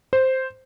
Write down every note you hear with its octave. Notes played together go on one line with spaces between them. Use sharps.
C5